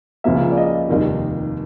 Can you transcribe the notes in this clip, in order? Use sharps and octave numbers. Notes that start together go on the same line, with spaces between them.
C#2 C#3 F3 A#3 E5
D5
D#5
F1 D#2 D#3 G3